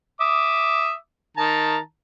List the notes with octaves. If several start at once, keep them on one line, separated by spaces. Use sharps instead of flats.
E5 D6 D#6
D#3 A5 A#5